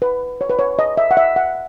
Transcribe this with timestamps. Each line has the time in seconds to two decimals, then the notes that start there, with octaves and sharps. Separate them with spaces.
0.02 B4
0.41 C#5
0.50 B4
0.59 C#5
0.79 D#5
0.97 E5
1.11 F#5
1.17 E5
1.36 F#5